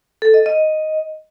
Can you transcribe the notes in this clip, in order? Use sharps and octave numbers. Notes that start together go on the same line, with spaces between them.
A4
D#5
D#5